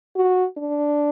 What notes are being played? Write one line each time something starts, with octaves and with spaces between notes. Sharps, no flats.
F#4
D4